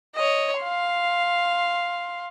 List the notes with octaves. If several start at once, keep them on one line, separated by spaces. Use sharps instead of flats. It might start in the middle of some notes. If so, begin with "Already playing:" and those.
C#5 D#5
F5 C6